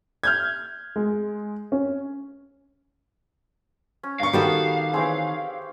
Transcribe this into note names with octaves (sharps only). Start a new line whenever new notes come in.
F6 G6 G#6
G#3
C#4
C#4
G2 F5 C#6
D#3 G3 B3 F#4 G4 A4 B5
E3 C4 G#4 C#5